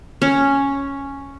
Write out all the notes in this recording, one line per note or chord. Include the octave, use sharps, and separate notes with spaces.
C#4